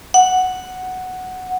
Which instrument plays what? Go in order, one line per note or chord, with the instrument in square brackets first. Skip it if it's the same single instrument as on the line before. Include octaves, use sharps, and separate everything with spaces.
[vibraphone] F#5